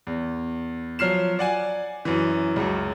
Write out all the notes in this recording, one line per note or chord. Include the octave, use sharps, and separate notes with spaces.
E2
F3 F#3 F6 C7 E7
D5 F#5 G#5
F#2 E3
C#2 F#2